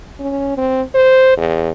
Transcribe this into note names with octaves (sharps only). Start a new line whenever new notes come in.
C#4
C4
C5
E2